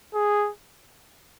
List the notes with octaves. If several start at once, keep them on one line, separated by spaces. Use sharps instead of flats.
G#4